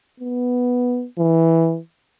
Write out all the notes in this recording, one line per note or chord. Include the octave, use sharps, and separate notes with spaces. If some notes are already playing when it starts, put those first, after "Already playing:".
B3
E3